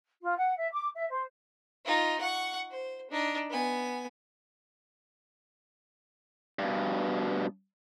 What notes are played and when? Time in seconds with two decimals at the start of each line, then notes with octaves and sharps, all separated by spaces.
0.21 F4
0.36 F#5
0.58 E5
0.72 D6
0.94 E5
1.11 C5
1.85 D#4 F4
2.21 F#5 C#6
2.71 C5
3.11 D4 D#4
3.50 B3 G#5
6.59 G2 B2